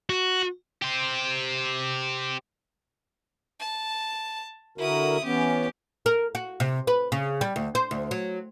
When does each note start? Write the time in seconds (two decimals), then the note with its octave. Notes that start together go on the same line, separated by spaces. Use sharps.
0.09 F#4
0.82 G4 C5
3.59 A5
4.78 D3 E4 F#4 A#4 D#6
5.24 E3 B3 C#4 G4
6.06 A#4
6.35 F#4
6.60 C3
6.87 B4
7.12 C#3
7.41 G3
7.56 D2
7.75 C5
7.91 D2
8.11 F#3